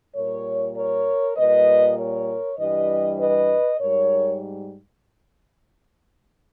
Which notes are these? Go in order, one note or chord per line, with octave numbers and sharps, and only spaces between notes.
A#2 G3 A#4 C#5
A#4 C#5
A#2 G3 B4 D#5
A#4 C#5
G2 E3 G3 B4 D#5
B4 D#5
G#2 G3 A#4 C#5